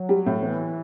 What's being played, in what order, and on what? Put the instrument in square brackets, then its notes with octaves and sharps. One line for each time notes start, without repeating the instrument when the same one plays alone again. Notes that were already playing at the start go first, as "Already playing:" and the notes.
Already playing: [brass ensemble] F#3
[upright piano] G3
A2
[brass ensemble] E3 [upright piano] B3